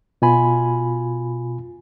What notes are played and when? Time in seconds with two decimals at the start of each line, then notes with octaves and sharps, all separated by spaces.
0.22 B2 F4 G#5 B5